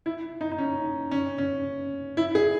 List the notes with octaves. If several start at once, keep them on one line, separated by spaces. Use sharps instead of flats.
E4
D#4
D#4
C#4
C#4
C#4
E4
G#4